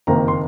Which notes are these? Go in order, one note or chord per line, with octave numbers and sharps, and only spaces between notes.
F#1 F2 D#3 A#3 A#5
C6